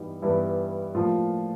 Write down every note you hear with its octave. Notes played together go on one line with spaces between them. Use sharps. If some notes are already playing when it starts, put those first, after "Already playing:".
Already playing: G2 E3 G3 B3 D#4
G2 E3 G3 B3 E4
A2 F3 A#3 F4